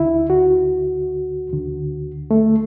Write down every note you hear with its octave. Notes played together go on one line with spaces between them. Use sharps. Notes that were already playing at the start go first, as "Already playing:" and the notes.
Already playing: D2 D3 E4
F#4
D2 D3
A3